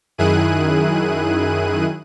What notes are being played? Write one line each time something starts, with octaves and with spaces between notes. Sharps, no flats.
F#2 D#3 E4 G#4 F#6 D#7